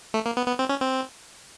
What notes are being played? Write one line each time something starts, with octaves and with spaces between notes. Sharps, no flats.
A3
A#3
B3
B3
C4
C#4
C4